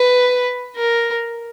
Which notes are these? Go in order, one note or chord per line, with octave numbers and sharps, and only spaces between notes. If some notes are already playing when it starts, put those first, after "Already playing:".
Already playing: B4
A#4